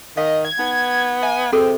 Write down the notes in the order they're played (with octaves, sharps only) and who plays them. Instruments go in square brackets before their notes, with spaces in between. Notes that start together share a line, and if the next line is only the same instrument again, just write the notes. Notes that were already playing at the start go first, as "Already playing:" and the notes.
[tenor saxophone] D#3 [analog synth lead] D#5 [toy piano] F5
[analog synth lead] G#6
[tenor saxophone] B3 [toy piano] D#4
[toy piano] E5 [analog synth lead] G#5
[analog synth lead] C3 [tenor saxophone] C4 [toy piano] F#4 G#4 A4